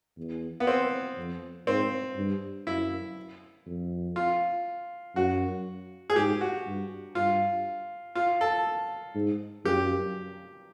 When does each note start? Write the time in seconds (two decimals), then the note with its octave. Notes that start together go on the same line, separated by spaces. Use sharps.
0.17 E2
0.60 B3
0.67 C4
1.17 F2
1.67 G#2 C4
2.16 G2
2.67 F#2 E4
3.66 F2
4.16 F4
5.16 F#2 F#4
6.10 G#4
6.16 G#2 G4
6.41 F#4
6.66 G2
7.15 G2 F4
8.15 F4
8.41 A4
9.15 G#2
9.65 F#2 G4